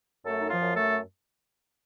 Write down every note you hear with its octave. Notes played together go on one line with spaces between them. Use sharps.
F#2 A3 A4
D#4
F3 F4
F#2
A3 A4